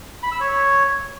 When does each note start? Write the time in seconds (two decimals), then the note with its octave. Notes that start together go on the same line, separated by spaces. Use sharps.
0.23 B5
0.32 E6
0.40 C#5